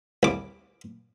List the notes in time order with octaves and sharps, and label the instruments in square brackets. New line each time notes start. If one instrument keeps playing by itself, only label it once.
[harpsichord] C2 D6